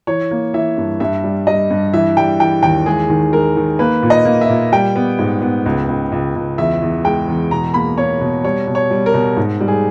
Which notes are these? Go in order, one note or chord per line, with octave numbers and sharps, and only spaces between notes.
E3 C#5
A#3
E3 E5
G2
G2 E5
G3
G3 D#5
G2
E3 E5
G3 G5
E3 G5
D#2 G5
G#3 G#4
D#3
G#3 A#4
D#3
A#3 B4
A#2
D#5
A#3
E5
A#2
G3 G5
B3
G#2
B3
C#2
C#2
C#2
C#2
E2 E5
E2
G#3 G5
E2
B2 A#5
A#3 B5
A#3 C#5
B2
G3 C#5
B2
C#5
G3
A#4
B2
G#2
G3
G#4